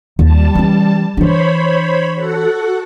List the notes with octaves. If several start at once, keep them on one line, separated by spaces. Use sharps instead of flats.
D#2 G3 A5
E3 C#4
E3 D4 C5 C#5 B5
F#4 A4 F#5